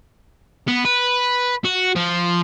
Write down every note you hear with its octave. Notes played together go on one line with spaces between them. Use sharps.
B3
B4
F#4
F3